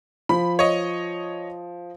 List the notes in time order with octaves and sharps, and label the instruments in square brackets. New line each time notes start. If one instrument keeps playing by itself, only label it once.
[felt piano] F3 [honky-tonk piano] B5
[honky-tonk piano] C#5 D#5